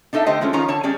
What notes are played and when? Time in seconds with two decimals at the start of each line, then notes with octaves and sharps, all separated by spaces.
0.13 D4 D#4 A4 D#5 E5
0.26 D3 A3 G4 C5 D#5
0.41 F3 G#3 A3 C#4
0.53 D#3 F3 C#4 F4 A#5
0.68 D3 C#5 A5
0.83 G3 C#4 G#4 D5